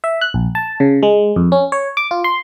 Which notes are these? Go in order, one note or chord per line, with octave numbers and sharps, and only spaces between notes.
E5
F#6
A#1
A5
C#3
G#3
F2
C#4
C#5
D6
F4
C6